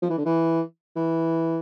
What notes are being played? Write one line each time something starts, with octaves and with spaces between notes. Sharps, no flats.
F3
E3
D3
E3
E3